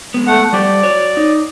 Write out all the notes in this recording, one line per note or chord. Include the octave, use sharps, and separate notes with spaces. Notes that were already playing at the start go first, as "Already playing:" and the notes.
G#3 B3
A3 F#5
G3 G4 C5 D5
F#4 C#5
D#4